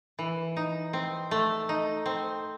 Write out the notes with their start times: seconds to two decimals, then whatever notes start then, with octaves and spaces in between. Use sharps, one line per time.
0.19 E3
0.57 D#4
0.93 C4
1.31 A3
1.69 D#4
2.06 C4